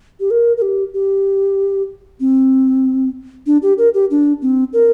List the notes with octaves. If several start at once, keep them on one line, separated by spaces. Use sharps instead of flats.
G4
A#4
A#4
G4
G4
C4
D4
G4
A#4
G4
D4
C4
A#4